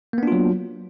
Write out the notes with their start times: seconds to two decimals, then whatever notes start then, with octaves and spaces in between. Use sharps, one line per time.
0.13 A#3
0.18 B3
0.23 D4
0.27 F4
0.32 F#3